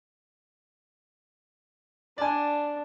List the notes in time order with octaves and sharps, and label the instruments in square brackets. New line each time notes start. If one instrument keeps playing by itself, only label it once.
[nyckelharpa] D4 [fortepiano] D5 G#5